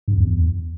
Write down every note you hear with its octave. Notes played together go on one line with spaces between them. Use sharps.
G2
F#2
E2